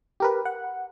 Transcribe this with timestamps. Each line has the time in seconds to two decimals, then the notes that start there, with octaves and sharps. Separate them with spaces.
0.20 G4 A#4 B4
0.45 F#5